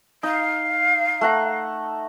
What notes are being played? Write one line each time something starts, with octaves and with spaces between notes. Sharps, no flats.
D#4 F5
A3 F#5 A#5